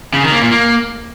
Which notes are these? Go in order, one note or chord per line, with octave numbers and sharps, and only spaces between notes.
C#3
D#3
A#3
A#2
A#3